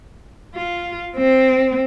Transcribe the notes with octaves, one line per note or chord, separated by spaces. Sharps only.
F4
C4